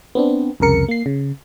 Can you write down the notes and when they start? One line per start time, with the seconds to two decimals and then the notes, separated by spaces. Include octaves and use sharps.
0.15 B3 C4 D4
0.60 C2 F2 C#3 A#4 C#7
0.88 A#3 C7
1.06 C#3